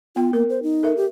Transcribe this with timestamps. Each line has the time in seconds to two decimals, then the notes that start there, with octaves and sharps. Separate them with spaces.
0.16 B3 F4 G5
0.33 A#3 A#4
0.49 C5
0.63 D#4
0.83 A4 A#4 E5
0.97 G4